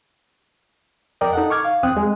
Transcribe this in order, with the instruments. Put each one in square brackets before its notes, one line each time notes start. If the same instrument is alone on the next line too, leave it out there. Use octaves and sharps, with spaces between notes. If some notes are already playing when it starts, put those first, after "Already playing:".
[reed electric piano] F2 A#4 D5 D#5 G5
D#4 A4 F#5
C#6 D6 F6 G#6
F5
E2 C4 G5 D#6 F#6
G#3